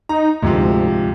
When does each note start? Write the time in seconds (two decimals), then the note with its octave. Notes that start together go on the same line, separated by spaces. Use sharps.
0.09 D#4 A#5
0.42 D2 G#2 C3 F3